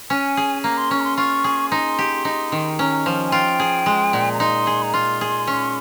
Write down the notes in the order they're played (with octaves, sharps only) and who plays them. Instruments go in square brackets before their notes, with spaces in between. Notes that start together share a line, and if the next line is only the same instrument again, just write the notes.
[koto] C#4 [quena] G#5
[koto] G#4
[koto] A#3 [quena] A#5
[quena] C6
[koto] C#4 [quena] C#6
[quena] A#5
C6
[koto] F4 [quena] C#6
[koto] G#4
[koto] D#4 [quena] C6
[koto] G4
D#4
D#3
[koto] C#4 [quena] A#5
[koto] F3
[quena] G#5
[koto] F4 [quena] G5
[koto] G#4
G#3
A#2
[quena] A#5
[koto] D#4 [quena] C6
[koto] G#4
[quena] A#5
[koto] F4 [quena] C6
[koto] G#4
C#4